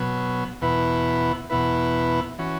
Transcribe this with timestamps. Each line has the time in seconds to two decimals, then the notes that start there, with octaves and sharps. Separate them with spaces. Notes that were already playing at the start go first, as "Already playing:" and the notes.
Already playing: B2 F#3 B3
0.61 E2 B2 B3 E4 B4
1.50 E2 B2 B3 E4 B4
2.38 E3 C#4 F#4